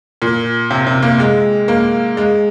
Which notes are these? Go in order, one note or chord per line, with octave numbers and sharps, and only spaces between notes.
A#2
C3
C3
A#3
G#3
A#3
G#3